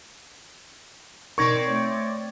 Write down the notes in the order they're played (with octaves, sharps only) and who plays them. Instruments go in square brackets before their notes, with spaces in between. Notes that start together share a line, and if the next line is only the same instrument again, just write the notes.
[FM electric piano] B2 D#4 A#4 [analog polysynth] C4 D5 [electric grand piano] C#6 G#6 A#6
[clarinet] A3 [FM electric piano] C#5